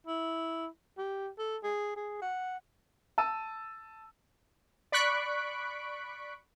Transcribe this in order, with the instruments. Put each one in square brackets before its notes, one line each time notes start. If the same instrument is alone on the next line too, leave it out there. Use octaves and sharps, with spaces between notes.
[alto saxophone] E4
G4
A4
G#4
G#4
F#5
[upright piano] A5 E6 D#7
[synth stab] D5 B5 C#6 F#6 B6 D7